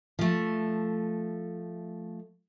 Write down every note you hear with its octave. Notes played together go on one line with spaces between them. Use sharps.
F3 A3